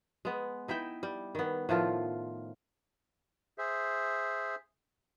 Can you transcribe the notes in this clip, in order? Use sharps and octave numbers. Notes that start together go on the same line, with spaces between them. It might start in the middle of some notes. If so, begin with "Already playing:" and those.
G#3 B3
D#4 E4 E5 G5
G3
D#3 B3
A2 D#3 F3 F4
G#4 C5 E5